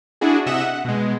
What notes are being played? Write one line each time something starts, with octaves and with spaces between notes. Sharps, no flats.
D4 E4 F#4 G#4
C3 D#5 E5 F#5 E7
F#5
B2 G#3